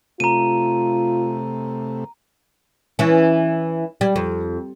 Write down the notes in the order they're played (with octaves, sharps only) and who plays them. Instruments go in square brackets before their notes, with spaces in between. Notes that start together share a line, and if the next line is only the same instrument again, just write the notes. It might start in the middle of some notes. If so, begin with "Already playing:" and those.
[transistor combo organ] C3 A3 [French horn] F4 [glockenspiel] A#5 D#7
[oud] E3 C#4
G3
F2